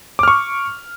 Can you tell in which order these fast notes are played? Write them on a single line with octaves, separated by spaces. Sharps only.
D6 F6 C#6